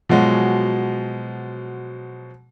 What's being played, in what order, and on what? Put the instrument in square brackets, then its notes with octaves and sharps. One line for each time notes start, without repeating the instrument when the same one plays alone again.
[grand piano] B2 F3 F#3 G#3